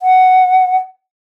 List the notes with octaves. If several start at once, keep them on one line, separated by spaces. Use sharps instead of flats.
F#5